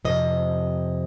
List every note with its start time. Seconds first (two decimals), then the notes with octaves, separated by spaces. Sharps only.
0.05 F2 C3 D#5